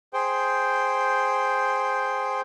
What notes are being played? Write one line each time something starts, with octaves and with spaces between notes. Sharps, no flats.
G#4 C5 G5